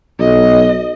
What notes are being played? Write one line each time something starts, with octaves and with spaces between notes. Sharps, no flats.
B1 D#5